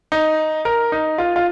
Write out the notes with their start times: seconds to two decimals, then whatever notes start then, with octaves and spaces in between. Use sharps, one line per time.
0.12 D#4
0.65 A#4
0.92 D#4
1.18 F4
1.36 F4